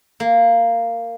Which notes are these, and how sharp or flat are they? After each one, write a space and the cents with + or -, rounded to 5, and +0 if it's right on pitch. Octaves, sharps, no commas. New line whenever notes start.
A#3 -10